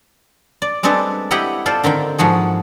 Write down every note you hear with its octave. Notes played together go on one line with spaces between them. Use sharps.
D5
G3 G#3 C4 D4 A4 B4
E4 G4 D#5 F#5 G5
F4 A4 C5 D5
D3 D#3 C4 G5
G#2 F3 F#4 G#4